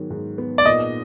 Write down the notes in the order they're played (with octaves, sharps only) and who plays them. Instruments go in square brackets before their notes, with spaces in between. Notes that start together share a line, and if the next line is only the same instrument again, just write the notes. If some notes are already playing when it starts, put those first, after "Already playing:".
Already playing: [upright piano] G#2 D#3 F#3 B3
G#2
B3
[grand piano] D5
[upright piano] A#2 [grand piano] D#5